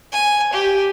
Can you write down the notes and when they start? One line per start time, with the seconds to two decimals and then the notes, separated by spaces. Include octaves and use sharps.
0.12 G#5
0.53 G4